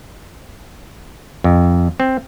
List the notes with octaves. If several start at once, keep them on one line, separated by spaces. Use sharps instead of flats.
F2
C4